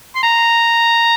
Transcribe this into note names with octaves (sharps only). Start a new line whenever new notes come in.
C6
A#5